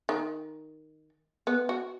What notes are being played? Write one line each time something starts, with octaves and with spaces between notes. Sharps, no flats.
D#3
B3
F#4